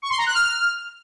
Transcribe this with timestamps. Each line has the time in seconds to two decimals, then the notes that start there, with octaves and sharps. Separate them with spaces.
0.02 C#6
0.10 C6
0.18 A#5
0.26 F#6
0.34 F6